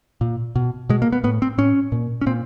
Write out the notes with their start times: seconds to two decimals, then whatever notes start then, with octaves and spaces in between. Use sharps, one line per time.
0.21 A#2
0.56 B2
0.89 B2 G#3
1.02 A#3
1.12 B3
1.24 A2 B3
1.42 C4
1.58 A2 C#4
1.92 A#2
2.21 C#4
2.26 A#2 C4